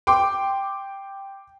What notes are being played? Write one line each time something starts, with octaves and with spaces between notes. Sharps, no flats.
G5 C6 D6